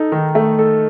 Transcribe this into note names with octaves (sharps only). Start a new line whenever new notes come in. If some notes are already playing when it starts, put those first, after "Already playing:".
Already playing: D#4 A4
D#3
A3
A4